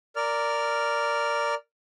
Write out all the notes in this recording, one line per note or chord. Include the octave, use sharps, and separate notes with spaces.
A#4 D5 F6